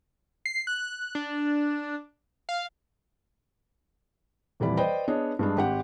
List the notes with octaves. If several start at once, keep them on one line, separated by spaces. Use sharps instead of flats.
C7
F#6
D4
F5
D#1 F2 E3 G3 D5 B5
B4 C5 D5 D#5 G5 B5
B3 D4 G#4 C#5 D#5
G2 G#3 D4
G#1 G4 F#5